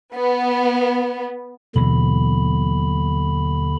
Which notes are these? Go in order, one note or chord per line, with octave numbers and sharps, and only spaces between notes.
B3
D#2 B2 D3 E3 F#3 B5